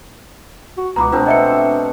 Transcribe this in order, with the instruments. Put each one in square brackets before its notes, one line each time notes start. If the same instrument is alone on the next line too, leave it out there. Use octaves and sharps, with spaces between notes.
[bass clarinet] F#4
[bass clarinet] C#2 [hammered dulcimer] B2 F#4 [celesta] A#5 B5 D6
[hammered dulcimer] B2 A3 C4 [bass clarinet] D4 [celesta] F4 B4
[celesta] D#5 E5 C#7 [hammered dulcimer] F#5